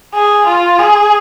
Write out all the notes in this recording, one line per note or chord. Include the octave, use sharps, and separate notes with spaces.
G#4
F4
G#4